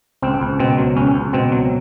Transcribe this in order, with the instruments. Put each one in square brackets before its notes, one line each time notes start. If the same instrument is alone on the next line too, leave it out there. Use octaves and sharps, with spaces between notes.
[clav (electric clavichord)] C#2 C4
C#2
B2 C4
F#3
C#2 C#4
C#2
B2 C4
F#3